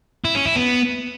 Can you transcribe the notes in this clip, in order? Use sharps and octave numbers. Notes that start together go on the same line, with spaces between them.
E4
C#4
E4
B3